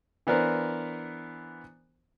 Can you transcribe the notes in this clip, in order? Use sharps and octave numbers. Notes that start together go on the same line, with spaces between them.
E3 B3 D4 A#4 C5